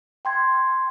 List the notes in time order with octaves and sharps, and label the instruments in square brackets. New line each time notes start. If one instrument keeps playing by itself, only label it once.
[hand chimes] G5 C6 G#6